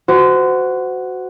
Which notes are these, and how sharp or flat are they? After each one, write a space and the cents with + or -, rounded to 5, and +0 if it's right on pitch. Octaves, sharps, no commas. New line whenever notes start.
F#4 +0 C5 -30